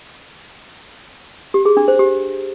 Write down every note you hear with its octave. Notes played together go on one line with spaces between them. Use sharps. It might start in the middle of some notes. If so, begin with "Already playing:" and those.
G4
G#4
D4
C5
G4